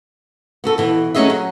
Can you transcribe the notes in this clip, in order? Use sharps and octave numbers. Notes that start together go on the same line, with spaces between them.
B3 F#4 A4
B2 E3
F#3 A3 C#4 G#4 D#5 E5
F#3